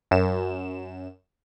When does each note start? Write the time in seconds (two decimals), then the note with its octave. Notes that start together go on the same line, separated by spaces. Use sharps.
0.11 F#2 E7